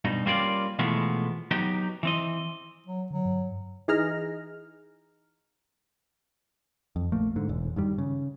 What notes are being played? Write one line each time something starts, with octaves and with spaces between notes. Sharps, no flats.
G2 B2 D#4
G3 A#3 C4 C#4 F4 D5
B2 E3 F3 G#3 A3 B3
F#3 B3 D#4 G4
E3 C4 D#5
F#3
D3 F#3
G2
E3 D#4 G#4 A#5 F6
F2
A#1 A3 A#3
G#2 D3
E1 E2
G2 D#3 G3
C#3